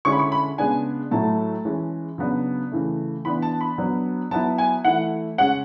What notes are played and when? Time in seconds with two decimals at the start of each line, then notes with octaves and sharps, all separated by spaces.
0.05 D3 G#3 C#4 E4 C#6
0.12 B5
0.19 C#6
0.32 B5
0.58 C#3 G#3 B3 D4 G#5
1.11 A2 F#3 A3 E4 A5
1.65 E3 G#3 C#4
2.18 C#3 F#3 B3 D4
2.72 C#3 E3 A3
3.25 E3 B3 D4 B5
3.42 A5
3.61 B5
3.78 F#3 B3 D4
4.31 F#3 B3 E4 A5
4.58 G#5
4.85 E3 A3 E4 F#5
5.38 C#3 G#3 C#4 F#5